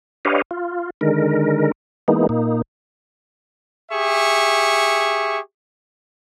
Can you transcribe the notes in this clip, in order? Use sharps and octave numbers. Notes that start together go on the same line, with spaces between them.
D4 G4 B4 C#5 D#5 F5
F4
D3 D#3 G#3 A#4
E3 G#3 A#3 B3 D#4
A#2 A#3 D#4
G4 G#4 E5 C#6